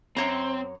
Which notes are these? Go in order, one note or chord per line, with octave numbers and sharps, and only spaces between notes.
F#2 C4 C#5 A#5